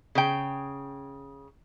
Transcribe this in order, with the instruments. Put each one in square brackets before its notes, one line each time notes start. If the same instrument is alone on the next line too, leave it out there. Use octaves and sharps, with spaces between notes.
[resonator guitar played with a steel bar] C#3 G5